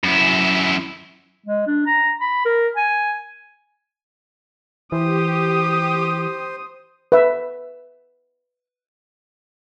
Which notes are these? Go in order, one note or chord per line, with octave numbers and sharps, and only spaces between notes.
F#2 E4
G#3
D4
A#5
B5
A#4
G#5
E3 G4 C5 D#6
B4 E5